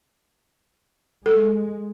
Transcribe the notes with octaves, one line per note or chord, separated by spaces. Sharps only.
G#3 A4